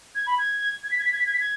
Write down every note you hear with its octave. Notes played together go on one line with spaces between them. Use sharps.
G#6
B5
G#6
G#6
B6
G#6
B6
G#6
B6
G#6
B6
G#6